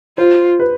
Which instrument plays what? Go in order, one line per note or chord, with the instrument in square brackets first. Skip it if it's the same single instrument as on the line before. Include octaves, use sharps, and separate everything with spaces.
[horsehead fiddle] F4 [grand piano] C5
[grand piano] B4